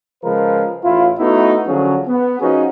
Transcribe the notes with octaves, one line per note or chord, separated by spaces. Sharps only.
C#3 F3 G#3 A#4 B4
A1 E4 F4
A3 B3 D#4 E4 F#4
D3 F3 F#3 C#4 G#4
B3
F3 C#4 D#4 F#4 G#4